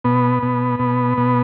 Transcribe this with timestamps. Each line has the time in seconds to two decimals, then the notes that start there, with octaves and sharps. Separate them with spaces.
0.04 B2 B3
0.43 B2
0.79 B2
1.17 B2